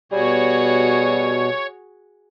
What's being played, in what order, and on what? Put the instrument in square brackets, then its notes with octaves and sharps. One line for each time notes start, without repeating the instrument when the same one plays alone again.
[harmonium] B2 [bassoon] G3 [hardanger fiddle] F#4 G#4 [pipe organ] C#5